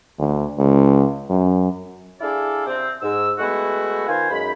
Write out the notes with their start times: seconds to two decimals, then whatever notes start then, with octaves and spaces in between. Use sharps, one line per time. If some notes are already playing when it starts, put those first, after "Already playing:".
0.19 D2
0.58 C#2
1.30 F#2
2.21 D4 E4 G#4 A4 D5 F5
2.67 C3 C4
3.01 G#2 E6
3.39 G#3 A3 B3 E4 F#4
4.08 D#3 F4 B4 C5 G#5
4.31 F#2 G#3 D#4 B5